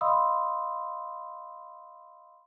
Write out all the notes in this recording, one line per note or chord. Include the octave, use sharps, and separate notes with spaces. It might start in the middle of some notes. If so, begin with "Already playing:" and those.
D#5 F5 B5 C6 D#6 E6